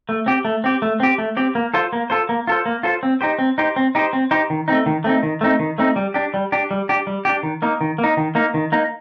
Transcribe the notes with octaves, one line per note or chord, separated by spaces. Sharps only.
A3
C4 G4
A3
C4 G4
A3
C4 G4
A3
C4 G4
A#3
F4 A4 C5
A#3
F4 A4 C5
A#3
F4 A4 C5
A#3
F4 A4 C5
C4
D#4 G4 C5
C4
D#4 G4 C5
C4
D#4 G4 C5
C4
D#4 G4 C5
D#3
A3 C4 D#4
D#3
A3 C4 D#4
D#3
A3 C4 D#4
D#3
A3 C4 D#4
G3
D4 G4
G3
D4 G4
G3
D4 G4
G3
D4 G4
D#3
A#3 D#4
D#3
A#3
D#4
D#3
A#3 D#4
D#3
A#3 D#4